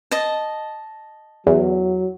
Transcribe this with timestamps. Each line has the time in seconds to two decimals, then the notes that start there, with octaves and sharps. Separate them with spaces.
0.11 D#5 A5
1.47 E2 F#3